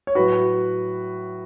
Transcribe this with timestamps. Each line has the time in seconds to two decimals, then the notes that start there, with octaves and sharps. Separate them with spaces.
0.07 C#5
0.15 A2 F#3 F#4 B4